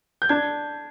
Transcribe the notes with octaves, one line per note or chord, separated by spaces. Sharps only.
G6
D4 G#6